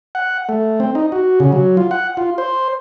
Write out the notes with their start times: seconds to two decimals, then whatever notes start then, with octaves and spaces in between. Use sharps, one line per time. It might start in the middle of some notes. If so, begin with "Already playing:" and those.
0.15 F#5
0.49 A3
0.80 C4
0.95 D#4
1.12 F#4
1.40 C#3
1.52 F#3
1.77 F4
1.91 F#5
2.17 F4
2.38 C5